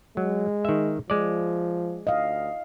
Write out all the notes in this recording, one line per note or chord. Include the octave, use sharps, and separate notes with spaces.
F#3 G#3
D#3 E5
F3 G#3 D5
D2 D#5 F5